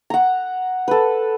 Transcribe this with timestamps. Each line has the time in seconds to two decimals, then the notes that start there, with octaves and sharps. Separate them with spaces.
0.10 F#5 A#5
0.88 A4 B4